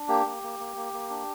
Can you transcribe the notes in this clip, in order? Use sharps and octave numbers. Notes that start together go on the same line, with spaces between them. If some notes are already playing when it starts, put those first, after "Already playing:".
Already playing: D4
A#3 G4
A#3
A#3
A#3
A#3
A#3
D4